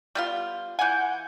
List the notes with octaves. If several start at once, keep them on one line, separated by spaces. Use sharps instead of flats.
G3 B3 F4
E3 F#5 G#5 G6